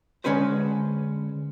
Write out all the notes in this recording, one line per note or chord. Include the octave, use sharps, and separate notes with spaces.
D3 G#3 C#4 G#4 B4 C5